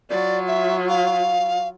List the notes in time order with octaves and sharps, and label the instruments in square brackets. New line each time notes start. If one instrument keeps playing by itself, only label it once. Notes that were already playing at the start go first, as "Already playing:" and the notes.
[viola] F#3 F4 [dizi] D5
[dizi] E5
F5